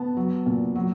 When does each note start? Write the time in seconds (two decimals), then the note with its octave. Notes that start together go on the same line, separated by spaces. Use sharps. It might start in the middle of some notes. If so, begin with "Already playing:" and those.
Already playing: B3 A5
0.17 F#3
0.46 A#2
0.75 F#3